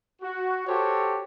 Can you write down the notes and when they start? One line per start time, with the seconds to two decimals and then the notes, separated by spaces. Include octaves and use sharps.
0.22 F#4
0.67 F#4 G4 A4 C5 C#5